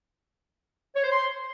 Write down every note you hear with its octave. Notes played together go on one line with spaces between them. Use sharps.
C#5
C5
C6